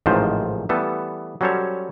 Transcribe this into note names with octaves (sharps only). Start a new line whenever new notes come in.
A1 G#2 C3 D#3 F3 C5
E3 G3 A3 B3 A4
F#3 G3 C#4 A4 C5 C#5